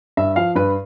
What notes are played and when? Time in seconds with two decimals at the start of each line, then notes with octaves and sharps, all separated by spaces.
0.17 G2 E5
0.36 F3 F5
0.55 G2 B4